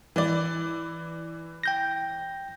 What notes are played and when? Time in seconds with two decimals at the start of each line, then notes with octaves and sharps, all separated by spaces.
0.16 E3 D5
1.63 G5 G6 A#6